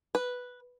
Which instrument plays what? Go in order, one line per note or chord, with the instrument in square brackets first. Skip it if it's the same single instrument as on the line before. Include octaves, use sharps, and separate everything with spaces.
[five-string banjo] B4